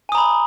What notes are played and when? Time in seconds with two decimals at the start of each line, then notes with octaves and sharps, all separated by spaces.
0.09 G#5
0.12 D#6
0.15 A#5
0.18 B5